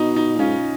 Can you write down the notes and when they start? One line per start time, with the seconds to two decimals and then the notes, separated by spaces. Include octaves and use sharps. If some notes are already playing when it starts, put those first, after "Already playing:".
Already playing: B2 D#4
0.16 D#4
0.34 A#2
0.39 G#2 C#4 F4